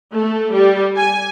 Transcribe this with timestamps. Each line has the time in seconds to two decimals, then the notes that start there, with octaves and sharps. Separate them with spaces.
0.15 A3
0.52 G3
0.98 G#5